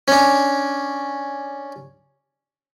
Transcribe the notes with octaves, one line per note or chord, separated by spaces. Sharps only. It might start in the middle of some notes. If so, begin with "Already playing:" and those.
C#4 D4